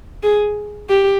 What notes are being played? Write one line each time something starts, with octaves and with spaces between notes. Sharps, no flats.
G#4
G4